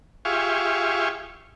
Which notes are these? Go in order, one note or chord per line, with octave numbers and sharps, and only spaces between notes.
F4 G4 G#4 E5 F5 C#6